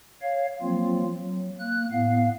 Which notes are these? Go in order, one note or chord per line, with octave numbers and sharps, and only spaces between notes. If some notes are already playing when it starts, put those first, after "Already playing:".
C#5 F5
F3 F#3 A#3 C4 F4
F#3
A#3 F#6
A2 B3 F5